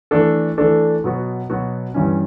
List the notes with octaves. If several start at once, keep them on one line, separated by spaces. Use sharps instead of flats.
E3 A3 D4 A4
E3 A3 D4 A4
B2 F#3 B3 F#4
B2 F#3 B3 F#4
G2 E3 G3 C#4